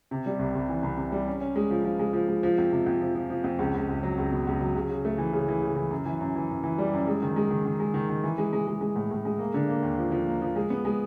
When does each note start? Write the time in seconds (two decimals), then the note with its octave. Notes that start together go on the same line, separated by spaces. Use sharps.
0.11 C3
0.26 G3
0.39 C2
0.55 C2
0.69 E3
0.83 C2
0.97 C3
1.12 G3
1.27 C#4
1.41 C#4
1.56 G#3
1.70 F3
1.85 F3
1.99 G#3
2.13 F3
2.28 G#3
2.43 F3
2.58 F2
2.71 C3
2.86 F2
3.01 F3
3.15 F3
3.30 F3
3.44 F2
3.59 C#2
3.74 C#2
3.89 C#2
4.03 F#3
4.18 C#2
4.32 B2
4.47 C#2
4.60 F#3
4.76 C#3
4.89 C#3
5.05 A3
5.18 E3
5.33 C#3
5.48 E3
5.62 C#3
5.76 E3
5.91 F#2
6.05 E3
6.21 F#2
6.35 E3
6.50 F#2
6.63 E3
6.78 G3
6.93 F#2
7.07 G#3
7.22 D#3
7.36 G#3
7.50 D#3
7.66 D#3
7.80 G#3
7.94 D#3
8.09 D#3
8.24 E3
8.38 G#3
8.53 G#3
8.67 G#3
8.81 G#3
8.96 A2
9.11 A2
9.25 G#3
9.39 A#3
9.54 D3
9.69 A#3
9.83 D#2
9.98 F3
10.12 F3
10.27 A#3
10.42 F3
10.56 G#3
10.70 B3
10.85 G#3